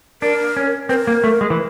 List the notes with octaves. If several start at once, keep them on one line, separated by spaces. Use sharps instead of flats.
D4 A#4
C#4
C4 B4
A#4
A#3
A3
G#3
E3